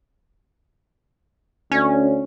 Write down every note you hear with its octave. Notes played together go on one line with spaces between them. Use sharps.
D2 C#4